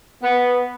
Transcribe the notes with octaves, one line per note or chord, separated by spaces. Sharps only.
B3